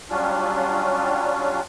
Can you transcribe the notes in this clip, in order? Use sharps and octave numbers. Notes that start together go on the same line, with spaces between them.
F#3 G3 C#4 D4 F4